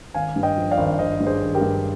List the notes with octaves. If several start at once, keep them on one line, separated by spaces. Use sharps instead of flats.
G#1 F5 G#5
G2
D#5 G5
F3
D5 F5
G#1
G#1 C5 D#5
G2
G#4 C5
G#1
G4 A#4
G2